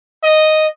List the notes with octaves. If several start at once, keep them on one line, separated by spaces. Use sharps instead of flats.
D#5